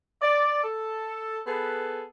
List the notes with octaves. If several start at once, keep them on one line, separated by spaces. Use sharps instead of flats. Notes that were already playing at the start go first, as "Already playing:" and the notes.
D5
A4
B3 G#4 A4 B4